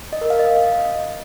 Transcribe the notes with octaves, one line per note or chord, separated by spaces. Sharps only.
D#5
A#4
F5
D#5